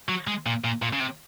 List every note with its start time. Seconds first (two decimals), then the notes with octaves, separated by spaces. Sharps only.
0.09 F#3
0.27 G#3
0.46 A#2
0.64 A#2
0.82 A#2
0.93 C#3
1.00 C3